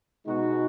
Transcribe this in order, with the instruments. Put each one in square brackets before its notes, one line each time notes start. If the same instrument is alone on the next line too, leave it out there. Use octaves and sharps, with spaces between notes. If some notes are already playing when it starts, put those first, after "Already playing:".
[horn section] B2 G#3 D#4 F#4